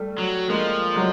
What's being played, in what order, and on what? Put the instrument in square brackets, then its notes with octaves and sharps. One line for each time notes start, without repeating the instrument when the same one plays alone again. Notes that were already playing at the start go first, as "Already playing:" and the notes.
Already playing: [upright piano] G3 A3
[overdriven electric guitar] F#3
[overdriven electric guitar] F3 [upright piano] G#3 A#3
[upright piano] F#3 G#3